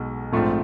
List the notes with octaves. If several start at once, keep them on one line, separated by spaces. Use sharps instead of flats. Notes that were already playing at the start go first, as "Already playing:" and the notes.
Already playing: B1 B2 G#3
A#1 G#2 F3 A3 C4